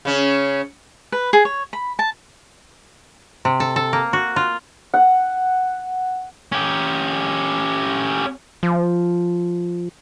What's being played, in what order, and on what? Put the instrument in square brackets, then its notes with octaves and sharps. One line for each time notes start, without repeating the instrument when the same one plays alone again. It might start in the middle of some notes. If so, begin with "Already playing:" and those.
[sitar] C#3 C#4
[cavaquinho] B4
G#4
C#5
B5
A5
[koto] C3
A4
A4
A#3
F#4
F4
[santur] F#5
[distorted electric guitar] C#4 G4
[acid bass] F3